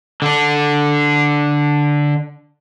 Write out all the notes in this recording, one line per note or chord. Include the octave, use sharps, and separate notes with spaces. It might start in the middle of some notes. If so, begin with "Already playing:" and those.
D3 D4